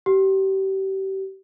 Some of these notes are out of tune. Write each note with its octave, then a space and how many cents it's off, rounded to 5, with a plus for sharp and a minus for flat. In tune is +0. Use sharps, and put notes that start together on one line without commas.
G4 -30